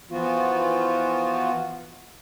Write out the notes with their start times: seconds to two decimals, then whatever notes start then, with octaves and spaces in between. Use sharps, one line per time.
0.11 E3 F3 B3 F4 F#4